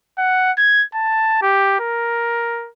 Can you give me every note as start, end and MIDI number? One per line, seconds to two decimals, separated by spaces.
0.18 0.52 78
0.58 0.84 92
0.94 1.40 81
1.42 1.79 67
1.80 2.69 70